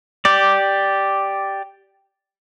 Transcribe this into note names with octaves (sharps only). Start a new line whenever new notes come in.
G4 D5